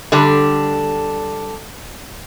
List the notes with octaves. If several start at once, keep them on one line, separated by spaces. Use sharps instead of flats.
D3 G3 D4